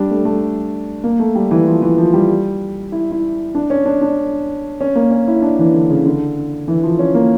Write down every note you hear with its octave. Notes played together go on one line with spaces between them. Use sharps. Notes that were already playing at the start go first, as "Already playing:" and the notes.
Already playing: G3 D4
A3
A3
A#3
A3
G3
E3
F3
E3
F3
G3
E4
E4
D4
C#4
D4
D4
C#4
A#3
C#4
E4
D4
E3
D3
C#3
D3
E3
F3
C#4
A#3